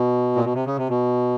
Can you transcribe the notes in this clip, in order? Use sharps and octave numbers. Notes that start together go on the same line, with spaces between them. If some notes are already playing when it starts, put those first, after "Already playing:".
Already playing: B2
A#2
B2
C3
C#3
C3
B2